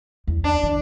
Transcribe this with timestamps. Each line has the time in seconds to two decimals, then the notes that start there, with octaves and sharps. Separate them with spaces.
0.27 E2
0.44 D4
0.63 D#3